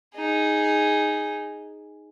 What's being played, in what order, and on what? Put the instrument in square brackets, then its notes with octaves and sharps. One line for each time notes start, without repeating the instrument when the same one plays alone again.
[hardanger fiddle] D#4 G#4